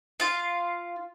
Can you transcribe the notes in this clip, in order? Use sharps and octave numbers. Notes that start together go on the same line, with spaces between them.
F4 F5